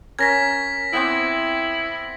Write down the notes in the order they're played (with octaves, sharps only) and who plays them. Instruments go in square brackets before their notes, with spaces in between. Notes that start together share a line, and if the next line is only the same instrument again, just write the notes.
[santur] C#4 A#4 [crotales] G#6 A#6 B6
[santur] B3 C4 D6 [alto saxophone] E4